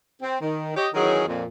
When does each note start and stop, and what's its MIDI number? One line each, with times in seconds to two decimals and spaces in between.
0.22 0.37 60
0.41 0.75 51
0.76 0.88 67
0.76 0.88 73
0.76 0.88 75
0.94 1.26 51
0.94 1.26 52
0.94 1.26 54
0.94 1.26 61
0.94 1.26 63
0.94 1.26 68
1.27 1.44 41
1.27 1.44 46